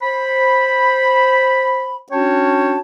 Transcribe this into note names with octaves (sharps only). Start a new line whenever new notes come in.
C5 B5
C#4 D4 F#4 C#5 G5 A5